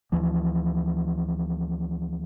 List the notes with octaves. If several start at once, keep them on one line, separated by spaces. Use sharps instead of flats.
D2 E3 F3